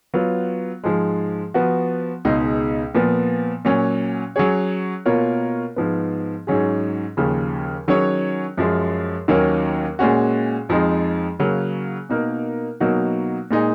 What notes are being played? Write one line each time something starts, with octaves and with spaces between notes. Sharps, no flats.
F#3 B3 F4
G#2 F3 G#3
F3 B3 F#4
C#2 B2 G#3 D#4 G#4
A#2 F3 B3
A#2 F#3 C#4
F#3 C#4 G#4 C#5
B2 A#3 F4 A#4 C#5
G#2 F3 B3
G#2 F#3 C#4 G#4
D#2 C#3 F3
D#3 F#3 C#4 G#4 C#5
F#2 F3 G#3
D#2 D#3 F#3 A#3 C#4
A#2 G#3 C#4 F#4
F2 F3 G#3 D#4
C#3 F#3 A#3
B2 A#3 D#4 A#4
B2 F#3 A#3 D#4 F#4
A#2 G#3 D#4